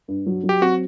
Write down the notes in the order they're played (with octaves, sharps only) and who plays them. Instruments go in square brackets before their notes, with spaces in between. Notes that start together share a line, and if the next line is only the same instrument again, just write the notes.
[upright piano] G2
F#3
F#3
[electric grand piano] G4
[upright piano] C4 [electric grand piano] F#4